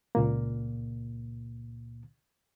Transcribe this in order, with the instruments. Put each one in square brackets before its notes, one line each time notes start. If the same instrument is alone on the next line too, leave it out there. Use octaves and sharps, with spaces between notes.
[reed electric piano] C#2 A#2 A#3